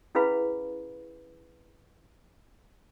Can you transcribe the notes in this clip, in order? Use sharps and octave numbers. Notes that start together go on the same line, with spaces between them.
C#4 E4 G#4 B4 F5 B5